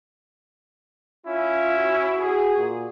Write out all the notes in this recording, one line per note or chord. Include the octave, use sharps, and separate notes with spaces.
C#4 E4 F4
F#4
G#4
A#2